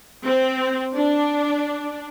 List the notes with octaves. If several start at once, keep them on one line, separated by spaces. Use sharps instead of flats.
C4
D4